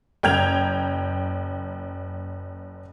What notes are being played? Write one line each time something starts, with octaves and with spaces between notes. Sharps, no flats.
F#1 G5 A#5 G6 G#6 F7